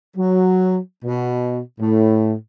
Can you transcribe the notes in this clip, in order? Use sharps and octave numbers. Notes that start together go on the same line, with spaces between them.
F#3
B2
A2